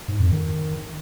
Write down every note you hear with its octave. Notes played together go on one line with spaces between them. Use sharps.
G#2
F2
D#3